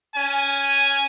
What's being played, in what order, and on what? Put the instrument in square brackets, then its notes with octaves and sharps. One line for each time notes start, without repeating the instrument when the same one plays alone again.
[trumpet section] C#4 G#5